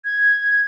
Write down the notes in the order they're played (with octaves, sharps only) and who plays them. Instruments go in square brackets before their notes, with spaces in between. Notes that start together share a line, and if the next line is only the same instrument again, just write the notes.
[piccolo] G#6